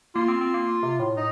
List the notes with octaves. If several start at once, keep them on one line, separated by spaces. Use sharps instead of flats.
A#3 F4
C4
C4
A#3
C3
A2
D#4